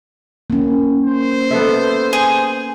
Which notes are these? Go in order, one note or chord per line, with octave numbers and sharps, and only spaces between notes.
A#3 C#4
C5
B3 A4 E5
G#4